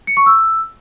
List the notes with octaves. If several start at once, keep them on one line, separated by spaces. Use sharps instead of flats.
C#7
C#6
E6